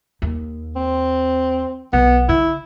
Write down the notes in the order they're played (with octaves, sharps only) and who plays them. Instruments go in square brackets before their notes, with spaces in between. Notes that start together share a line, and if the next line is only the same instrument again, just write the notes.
[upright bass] D#2
[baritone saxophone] C4
[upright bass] B1 [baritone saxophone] B3
[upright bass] D3 [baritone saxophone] E4